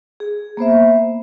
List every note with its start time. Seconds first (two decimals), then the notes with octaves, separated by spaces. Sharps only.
0.20 G#4
0.57 A#3 B3 C5 E5